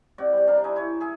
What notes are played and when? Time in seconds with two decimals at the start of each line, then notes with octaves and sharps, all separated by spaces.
0.18 C3 F#4 D5
0.33 G3 G4
0.47 D4 F5 A#5
0.64 D#4 E4 G#5
0.76 E4 C#5
1.01 G#4 E5 G#5